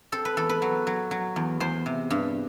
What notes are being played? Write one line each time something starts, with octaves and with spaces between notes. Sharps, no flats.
C4 A4
B4
E2 A4
B4
F#3
F#3
F#3
E2
E2 C5
C3
G2